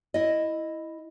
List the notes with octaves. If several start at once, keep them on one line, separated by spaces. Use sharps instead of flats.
E4 D#5